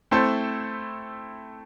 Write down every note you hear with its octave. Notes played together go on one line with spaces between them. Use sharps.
A3 C4 E4 A4 C5